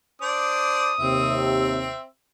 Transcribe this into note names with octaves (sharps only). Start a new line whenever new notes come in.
D4 C5 D6 D#6
D#2 C3 C4 E5